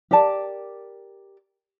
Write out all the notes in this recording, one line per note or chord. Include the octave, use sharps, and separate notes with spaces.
G4 A#4 D5 A5